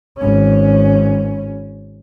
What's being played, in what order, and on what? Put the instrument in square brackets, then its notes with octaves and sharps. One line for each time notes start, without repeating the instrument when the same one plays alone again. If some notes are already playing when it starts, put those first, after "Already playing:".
[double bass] G#1 C#4